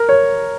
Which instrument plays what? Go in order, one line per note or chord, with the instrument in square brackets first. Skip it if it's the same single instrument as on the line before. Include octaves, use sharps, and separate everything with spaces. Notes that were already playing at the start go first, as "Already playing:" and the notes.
Already playing: [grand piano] A#4
C#5